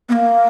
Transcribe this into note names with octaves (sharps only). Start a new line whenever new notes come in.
B3
A#3